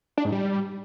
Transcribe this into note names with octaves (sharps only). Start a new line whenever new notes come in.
D4
G#2
G3